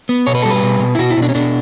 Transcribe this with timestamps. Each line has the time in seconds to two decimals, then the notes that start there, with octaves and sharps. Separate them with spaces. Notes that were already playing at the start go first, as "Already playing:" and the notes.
0.09 B3
0.27 B2 C#5
0.35 B4
0.42 G3 A4
0.50 B4
0.63 B2
0.80 B2
0.95 E4
0.99 B2 F#4
1.10 E4
1.17 B2
1.22 D4
1.29 C#4
1.35 B2 D4